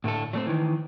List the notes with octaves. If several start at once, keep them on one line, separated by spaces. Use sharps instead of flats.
A2 D3 A3 A4
F#3 A3 C4
D#3 E3